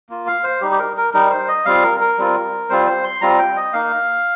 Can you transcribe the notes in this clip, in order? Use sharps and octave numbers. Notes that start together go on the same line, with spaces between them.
A#3 F4
F5
C5
G3 D#4 G4
G4
A#4
A#4
G3 D#4 A#4
C5
D#5
G3 C4 F4 F5
A#4
A#4
G3 C4 F4
G3 C4 F4 C5
C5
C6
G3 C4 F4 A#5
G5
D#5
A#3 D#4 F5